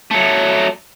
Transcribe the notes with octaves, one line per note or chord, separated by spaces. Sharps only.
F#3 A3